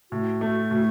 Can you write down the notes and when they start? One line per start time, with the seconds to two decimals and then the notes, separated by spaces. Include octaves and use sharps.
0.11 A2 F#4
0.41 A3
0.71 A2